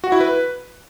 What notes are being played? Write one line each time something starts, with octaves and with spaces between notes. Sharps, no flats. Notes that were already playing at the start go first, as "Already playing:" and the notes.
F#4
E4
B4